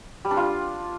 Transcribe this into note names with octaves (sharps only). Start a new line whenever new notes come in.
G3
D4
F4